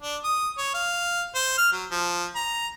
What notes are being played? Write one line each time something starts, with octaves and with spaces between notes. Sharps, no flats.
D4
D#6
C#5
F5
C5
F6
F#3
F3
A#5